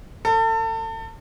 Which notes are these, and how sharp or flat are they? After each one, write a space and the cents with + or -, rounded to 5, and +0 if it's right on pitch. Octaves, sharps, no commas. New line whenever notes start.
A4 +35